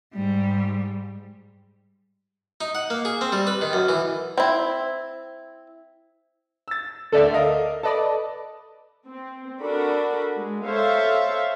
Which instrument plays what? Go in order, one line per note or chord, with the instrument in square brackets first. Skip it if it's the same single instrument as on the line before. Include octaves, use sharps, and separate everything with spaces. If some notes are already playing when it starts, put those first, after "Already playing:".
[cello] G#2 G3
[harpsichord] D#4
F#5
A#3
G#4
C4
G3
B4
D#3
F#2
E3
[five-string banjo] C4 E4
[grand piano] E6 A6
[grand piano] D2 D3 [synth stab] A4 D5 E5
[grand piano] A#4 D#5 F5
[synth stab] A4 B4 D5 [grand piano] D#5 A5
[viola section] C4
D4 F#4 A4 A#4 B5
G#3
A4 C5 C#5 E5 F5